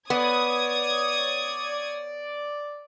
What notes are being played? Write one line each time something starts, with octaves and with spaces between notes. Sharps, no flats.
B3 C#5 D5 D#6 G#6